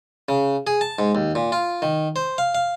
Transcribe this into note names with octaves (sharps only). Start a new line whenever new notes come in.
C#3
G#4
A5
G#2
D#2
A#2
F4
D#3
C5
F5
F5